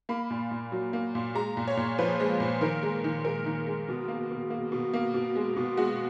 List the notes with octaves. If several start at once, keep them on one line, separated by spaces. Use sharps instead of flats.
A#3 B5
A#2
A#2
F#3
A#3
A#2
G#3 A#5
A#2
C#5
A#2
F3 B4
G#3
A#2
D#3 A#4
G#3
D#3
G#3 A#4
D#3
G#3
B2
A#3
B2
A#3
B2
A#3
B2
G#3
B2
G#3 F#4